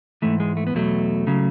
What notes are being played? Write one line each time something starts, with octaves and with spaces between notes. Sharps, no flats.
G#2 E3 A3
G#3
A3
B3
E2 B2 F#3 A3
C#3 F#3